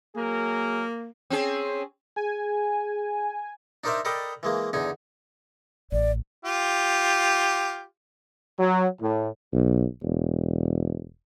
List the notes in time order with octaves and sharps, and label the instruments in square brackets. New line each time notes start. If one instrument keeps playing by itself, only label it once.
[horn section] F#3 G#4 A#4 [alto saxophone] A#3
[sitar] C4 C#4 G#4
[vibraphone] G#4 [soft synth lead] G#5
[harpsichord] D4 D#4 A#4 C5 D5 E5
A4 A#4 D5 D#5 G5 B5
E3 G#3 A#3
E2 D3 D#4 G#5
[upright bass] A1 [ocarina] D5
[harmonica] F4 G4
[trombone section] F#3
A2
[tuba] B1
E1